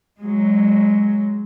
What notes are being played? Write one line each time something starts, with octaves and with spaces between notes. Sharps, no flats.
F#3 G#3